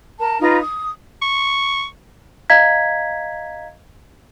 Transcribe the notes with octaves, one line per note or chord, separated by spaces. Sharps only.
A#4 A5
D#4 F4 B4 A#5
D#6
C#6
D#5 F5 A#5 G#6 B6